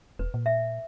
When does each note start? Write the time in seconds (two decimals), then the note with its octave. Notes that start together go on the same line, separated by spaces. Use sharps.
0.19 E1 B4
0.34 A#2
0.46 E5